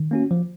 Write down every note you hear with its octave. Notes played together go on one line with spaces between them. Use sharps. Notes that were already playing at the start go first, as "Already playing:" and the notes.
Already playing: D#3
A#3 C#4 F#4
F3